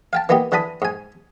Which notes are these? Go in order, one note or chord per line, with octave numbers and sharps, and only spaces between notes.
F5 G5 A5
E3 A#3 B3 D#4 G4
D3 E3 A4 B5 D#6
G#2 G#5